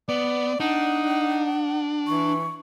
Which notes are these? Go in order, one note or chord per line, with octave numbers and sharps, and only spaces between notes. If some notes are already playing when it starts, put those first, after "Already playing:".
B3 D5
D4 D#4 F#5
E3 C#6